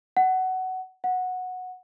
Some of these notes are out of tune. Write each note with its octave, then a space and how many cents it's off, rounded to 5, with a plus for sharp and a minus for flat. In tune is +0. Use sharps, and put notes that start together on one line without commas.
F#5 +15
F#5 -10